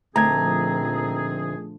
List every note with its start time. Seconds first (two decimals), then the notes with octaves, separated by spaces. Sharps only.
0.16 D2 A#2 D#3 F3 C4 G#4 A#5 G#6